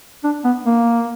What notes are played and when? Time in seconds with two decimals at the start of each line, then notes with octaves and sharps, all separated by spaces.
0.24 D4
0.44 B3
0.66 A#3